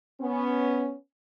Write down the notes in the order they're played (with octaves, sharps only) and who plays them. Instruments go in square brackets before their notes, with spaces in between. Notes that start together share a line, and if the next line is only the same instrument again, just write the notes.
[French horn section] B3 C#4